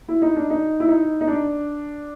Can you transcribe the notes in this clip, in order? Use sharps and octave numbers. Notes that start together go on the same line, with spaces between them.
E4
D#4
D4
D#4
E4
D#4
D#4
D4